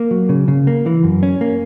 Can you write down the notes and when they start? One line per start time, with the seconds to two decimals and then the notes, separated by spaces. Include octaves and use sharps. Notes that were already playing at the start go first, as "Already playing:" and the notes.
Already playing: A#3
0.11 F#3
0.29 C#3
0.48 C#3
0.67 A#3
0.86 E3
1.04 F#2
1.23 C#4
1.41 A#3